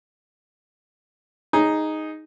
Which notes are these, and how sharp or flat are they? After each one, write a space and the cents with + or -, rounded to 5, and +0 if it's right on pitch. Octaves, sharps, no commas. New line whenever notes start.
D#4 +0 G#4 +0